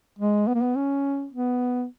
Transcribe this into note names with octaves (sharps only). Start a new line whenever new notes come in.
G#3
B3
A#3
B3
C#4
B3